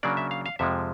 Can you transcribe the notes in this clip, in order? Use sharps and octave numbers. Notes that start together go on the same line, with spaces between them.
C#3 F#3 A#3 D4 D5
E5
F5
F5
F2 C3 F3 G#3 E5